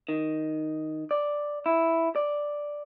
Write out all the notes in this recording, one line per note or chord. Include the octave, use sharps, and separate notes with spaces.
D#3
D5
E4
D5